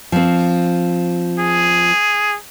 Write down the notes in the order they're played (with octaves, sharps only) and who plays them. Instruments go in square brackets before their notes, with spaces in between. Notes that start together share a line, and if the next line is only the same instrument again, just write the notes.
[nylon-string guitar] F3 C4
[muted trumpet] G#4